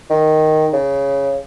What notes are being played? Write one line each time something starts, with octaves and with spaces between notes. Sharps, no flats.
D#3
C#3